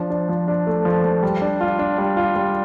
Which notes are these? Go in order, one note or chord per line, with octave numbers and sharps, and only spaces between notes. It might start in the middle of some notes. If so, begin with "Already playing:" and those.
Already playing: F3 D4
D4
F3
D4
A3
F3
F3
G3
D4
F4
D4
G3
F4
G3